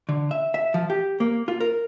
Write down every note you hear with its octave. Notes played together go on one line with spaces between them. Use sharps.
D3
E5
E5
F3
G4
A#3
F4
A#4